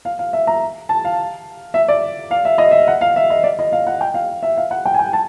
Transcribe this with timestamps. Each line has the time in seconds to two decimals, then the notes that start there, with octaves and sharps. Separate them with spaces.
0.05 F5
0.19 F5
0.33 E5
0.47 A#5
0.89 A5
1.04 F5
1.74 E5
1.88 D5
2.31 F5
2.45 E5
2.58 D#5
2.71 E5
2.88 F#5
3.01 F5
3.16 E5
3.30 D#5
3.44 D5
3.59 D#5
3.72 F5
3.87 F#5
4.01 G5
4.14 F5
4.43 E5
4.57 F5
4.71 F#5
4.85 G5
4.94 G#5
4.99 G5
5.13 A5